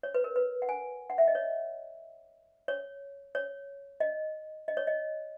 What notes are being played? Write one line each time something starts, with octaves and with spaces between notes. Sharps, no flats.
C#5
B4
A#4
B4
F#5
G#5
F#5
E5
D#5
C#5
C#5
C#5
D#5
D#5
C#5
D#5